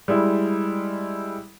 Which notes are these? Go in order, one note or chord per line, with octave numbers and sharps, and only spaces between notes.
G3 G#3 E4